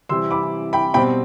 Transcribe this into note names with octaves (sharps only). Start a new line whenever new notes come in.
C3 E3 G3 C4 E4 C6 E6
B5 D6
G5 B5
B2 G3 C4 G5 B5